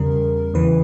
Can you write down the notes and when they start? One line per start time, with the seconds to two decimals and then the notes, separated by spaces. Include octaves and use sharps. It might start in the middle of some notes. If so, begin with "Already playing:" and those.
Already playing: E2 C#3 G3 A#4
0.54 E2 C#3 E3 B4